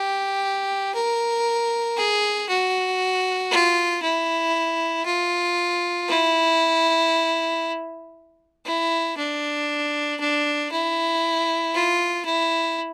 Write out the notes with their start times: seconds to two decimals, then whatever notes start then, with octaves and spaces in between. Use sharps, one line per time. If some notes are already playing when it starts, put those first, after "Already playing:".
Already playing: G4
0.94 A#4
1.97 G#4
2.49 F#4
3.51 F4
4.03 E4
5.06 F4
6.08 E4
8.65 E4
9.17 D4
10.20 D4
10.72 E4
11.75 F4
12.26 E4